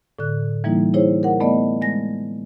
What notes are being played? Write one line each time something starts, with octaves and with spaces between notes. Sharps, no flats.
A2 D3 F#6
E3 G3 A#3 D#4 E4
D#4 E4 G#4 C5 C#5
A#4 F#5
A3 B3 D5 D#5
G#3 A#6